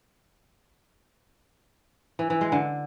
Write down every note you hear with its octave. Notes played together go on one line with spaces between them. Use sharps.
E3
E3
G#3
D3